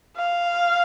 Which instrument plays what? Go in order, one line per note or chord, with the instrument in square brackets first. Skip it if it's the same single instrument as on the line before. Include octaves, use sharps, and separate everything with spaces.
[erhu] F5